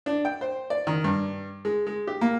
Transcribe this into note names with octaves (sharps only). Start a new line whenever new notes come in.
D4
G5
C5
D5
D#3
G2
G#3
G#3
G4
A#3